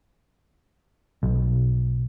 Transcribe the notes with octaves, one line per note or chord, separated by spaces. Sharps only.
B1